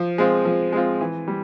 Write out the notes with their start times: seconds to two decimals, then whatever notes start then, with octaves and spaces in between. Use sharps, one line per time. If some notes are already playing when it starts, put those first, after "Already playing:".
Already playing: F3
0.18 G#3 C4 F4
0.45 F3
0.72 G#3 C4 F4
1.01 E3
1.28 G3